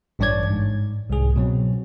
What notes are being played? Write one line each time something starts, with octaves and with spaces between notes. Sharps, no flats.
A1 G2 D4 C#5 D5 G#6
G#2
C2 G#2 G#4
B2 F#3 C4